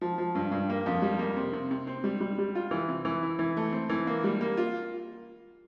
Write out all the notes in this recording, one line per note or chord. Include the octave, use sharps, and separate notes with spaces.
F3
F3
G2
G2
A#3
F2
G3
A#3
C3
C3
C3
C4
G3
G3
G3
F4
E3
C3
E3
E4
E3
A3
C4
E3
A#3
G3
A#3
F4